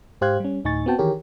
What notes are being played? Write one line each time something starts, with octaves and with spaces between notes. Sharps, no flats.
G#2 G4 C5 F5 F#6 G#6
G3 C#4
D2 A2 D#4 G#5 C#6 A6
B3 C4 F#4 G5 A5
D#3 E3 G4 G#4 A#4 C#5